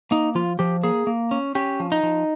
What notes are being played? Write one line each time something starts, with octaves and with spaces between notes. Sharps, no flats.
A#3 D#4
F3 F4
F3 G4
A#3 G#4
A#3
C#4
C#4 G4
F3
D#4
F3